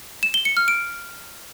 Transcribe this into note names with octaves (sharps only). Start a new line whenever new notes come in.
E7
G7
C#7
F6
D7